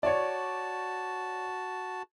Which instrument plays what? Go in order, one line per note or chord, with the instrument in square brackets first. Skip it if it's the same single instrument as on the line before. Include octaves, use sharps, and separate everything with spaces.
[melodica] F#4 A5 [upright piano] C#5 D5